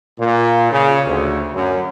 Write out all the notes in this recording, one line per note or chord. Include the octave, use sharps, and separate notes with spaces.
A#2
C#3
D2
F#2